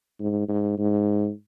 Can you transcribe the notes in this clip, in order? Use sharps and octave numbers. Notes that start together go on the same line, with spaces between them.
G#2
G#2
G#2